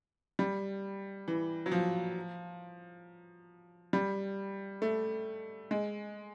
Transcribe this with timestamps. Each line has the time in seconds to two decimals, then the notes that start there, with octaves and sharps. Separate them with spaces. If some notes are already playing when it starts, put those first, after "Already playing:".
0.39 G3
1.28 E3
1.66 F#3
1.71 F3
3.93 G3
4.82 A3
5.71 G#3